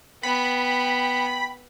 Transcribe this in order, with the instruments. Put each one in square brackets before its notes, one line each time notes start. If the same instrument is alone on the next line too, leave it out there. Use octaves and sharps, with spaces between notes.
[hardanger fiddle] B3 [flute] G5 [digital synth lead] B5